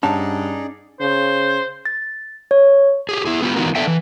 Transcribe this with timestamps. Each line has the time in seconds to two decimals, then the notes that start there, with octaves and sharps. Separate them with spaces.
0.03 G2 C#4 D#4 G#4 D5 F#5 A5
1.00 C#3 C5
1.85 A6
2.51 C#5
3.09 G4 G#4
3.25 E4 G#4
3.42 B3 F4 G4
3.56 D#3 E3 B3 D#4 F#4 A#4
3.75 B3 D4 A4 E5 G5
3.87 E3